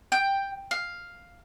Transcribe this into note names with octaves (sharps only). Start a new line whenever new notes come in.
G5
F5